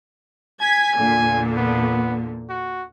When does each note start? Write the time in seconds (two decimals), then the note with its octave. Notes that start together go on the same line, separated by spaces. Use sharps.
0.61 G#5 G#6 B6
0.97 E2 A#2 D3
1.56 B3
2.49 F#4